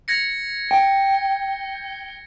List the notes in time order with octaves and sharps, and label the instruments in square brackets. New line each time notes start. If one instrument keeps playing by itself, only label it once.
[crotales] G#6 A#6 C#7
[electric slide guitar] G5